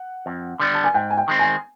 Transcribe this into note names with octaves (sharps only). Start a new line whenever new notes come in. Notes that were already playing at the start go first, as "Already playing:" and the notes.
Already playing: F#5
F2
D3 G3 B3
A5
G#5
G#2 G5
G#5
G5
D#3 G#3 C4
G#5